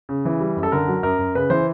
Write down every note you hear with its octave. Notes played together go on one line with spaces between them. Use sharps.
C#3
E3
G3
F#2
A4
D3 A#4
F#3
F#2 A#4
F#2
C#3 B4
E3 C5